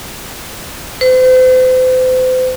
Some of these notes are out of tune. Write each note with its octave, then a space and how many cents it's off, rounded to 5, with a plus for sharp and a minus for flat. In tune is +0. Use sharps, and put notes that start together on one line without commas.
C5 -40